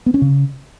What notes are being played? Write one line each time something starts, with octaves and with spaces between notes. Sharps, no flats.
B3
C#4
C#3